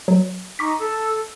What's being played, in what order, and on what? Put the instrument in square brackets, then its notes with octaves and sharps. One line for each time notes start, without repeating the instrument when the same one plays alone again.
[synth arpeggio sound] F#3
[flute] D#4 [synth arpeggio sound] C#6 D6 B6
[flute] A4